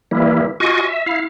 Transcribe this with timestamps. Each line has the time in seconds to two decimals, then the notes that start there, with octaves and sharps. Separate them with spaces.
0.11 E3 G3 A#3 E4
0.60 F4 F#4 D#5 G#5 C#6
0.84 E5
1.06 E4 F5